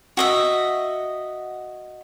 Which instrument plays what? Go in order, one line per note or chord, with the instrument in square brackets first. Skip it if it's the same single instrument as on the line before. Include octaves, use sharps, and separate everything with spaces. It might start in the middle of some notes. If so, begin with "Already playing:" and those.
[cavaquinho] F#4 D#5 E5